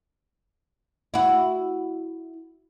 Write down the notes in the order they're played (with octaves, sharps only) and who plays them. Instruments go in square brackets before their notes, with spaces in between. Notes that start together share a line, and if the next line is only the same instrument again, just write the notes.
[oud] E4 F#4